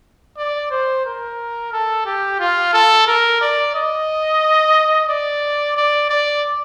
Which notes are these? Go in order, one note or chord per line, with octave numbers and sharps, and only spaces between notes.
D5
C5
A#4
A4
G4
F4
A4
A#4
D5
D#5
D5
D5
D5